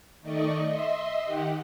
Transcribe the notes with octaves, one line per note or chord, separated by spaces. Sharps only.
D#3 A3 D5 D#5 C#6
D#5 E5 C6
D#3 G4 F#5